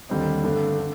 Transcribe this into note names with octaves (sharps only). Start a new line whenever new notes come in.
D#2 D3 G3 C4 D#4
G2 D3 A3 D4
D3